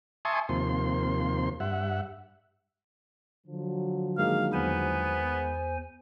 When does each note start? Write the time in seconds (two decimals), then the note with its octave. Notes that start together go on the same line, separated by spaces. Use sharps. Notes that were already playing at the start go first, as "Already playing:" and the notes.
0.25 E5 G#5 A5 C6 C#6 D#6
0.49 D#2 C3 F3 A#3 C6
1.60 G2 E5 F#5
3.47 D3 F3 F#3
4.18 D#3 G#3 A#3 F5
4.53 E2 B3 C5 G#5